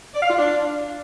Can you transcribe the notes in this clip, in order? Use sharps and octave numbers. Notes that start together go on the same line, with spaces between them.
D5
F5
F4
D4